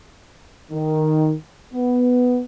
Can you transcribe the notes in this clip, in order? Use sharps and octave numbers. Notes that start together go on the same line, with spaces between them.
D#3
B3